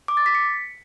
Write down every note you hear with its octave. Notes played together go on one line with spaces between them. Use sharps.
D6
A6
B6
C#7